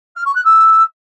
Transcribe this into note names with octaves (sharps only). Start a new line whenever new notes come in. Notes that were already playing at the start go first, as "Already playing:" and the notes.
F6
C#6
F#6
E6